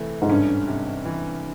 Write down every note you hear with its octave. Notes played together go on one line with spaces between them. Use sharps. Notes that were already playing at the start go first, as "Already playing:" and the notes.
Already playing: C3 E3 A3
G#2
G2 C#4
C3
E3